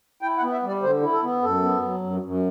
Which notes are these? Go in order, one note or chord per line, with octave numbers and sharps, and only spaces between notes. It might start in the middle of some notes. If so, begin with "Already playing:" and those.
E4 G5
F#5
B3
E5
G3 D5
D3 C5
E4
A4
B3
F#2 A4
B3
F#3
F#2
F#2